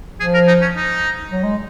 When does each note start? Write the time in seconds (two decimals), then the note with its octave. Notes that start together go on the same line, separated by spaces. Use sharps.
0.20 F3 G#4
0.34 A#4
0.48 D#4
0.62 C#4
0.76 D#4
1.32 F#3
1.44 G#3